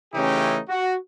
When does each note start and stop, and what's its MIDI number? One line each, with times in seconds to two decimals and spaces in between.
0.15 0.59 49
0.15 0.59 52
0.15 0.59 57
0.15 0.59 61
0.15 0.59 63
0.15 0.59 67
0.69 0.95 66